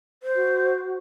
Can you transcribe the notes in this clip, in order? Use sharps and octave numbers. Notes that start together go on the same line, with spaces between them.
C5
F#4